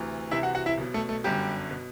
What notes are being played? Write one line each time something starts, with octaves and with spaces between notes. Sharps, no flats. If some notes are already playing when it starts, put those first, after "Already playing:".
Already playing: D2 C3 E3
C2 C3 E3 E4 E5
F#4 F#5
F#4 F#5
E4 E5
B1 B2
A3 A4
A3 A4
G1 F#2 D3 G3 G4
B2